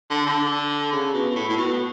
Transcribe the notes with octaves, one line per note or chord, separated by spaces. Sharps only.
D3
D3
C#3
B2
B2
A2
A2
B2